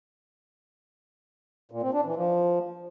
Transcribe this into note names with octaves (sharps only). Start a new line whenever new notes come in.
A#2
C4
D4
E3
F3